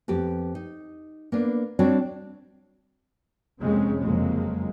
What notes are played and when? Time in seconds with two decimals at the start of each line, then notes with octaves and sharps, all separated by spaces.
0.08 F2 B3 G4
0.55 D#4
1.32 A#3 B3 D4
1.79 G3 C4 D4 F#4 C#5 D5
3.60 F2 C3 G#3 A#3 C4 C#4
4.01 F#1 F2 C3 F#3 G#3 A#3